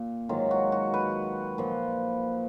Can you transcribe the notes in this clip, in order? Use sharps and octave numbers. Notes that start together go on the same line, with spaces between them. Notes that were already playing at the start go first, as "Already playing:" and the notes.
Already playing: A#2
G#2 D#3 F#3 F4
F#4
F#4
B4
A#2 F3